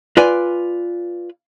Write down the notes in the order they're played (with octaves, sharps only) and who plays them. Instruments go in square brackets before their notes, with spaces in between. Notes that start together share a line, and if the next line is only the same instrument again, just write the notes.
[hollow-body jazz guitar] F4 B4 D5 G#5